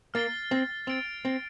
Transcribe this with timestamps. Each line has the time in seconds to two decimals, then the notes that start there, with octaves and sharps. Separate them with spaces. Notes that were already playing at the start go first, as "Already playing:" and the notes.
0.14 A#3 F6 A6 C7 G7
0.51 C4
0.87 C4 A6 D7 F7
1.25 C4